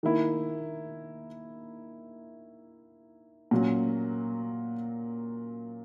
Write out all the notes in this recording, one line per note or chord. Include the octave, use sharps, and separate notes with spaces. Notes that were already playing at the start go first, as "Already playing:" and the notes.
D#3 A#3 E4
A#2 F#3 C#4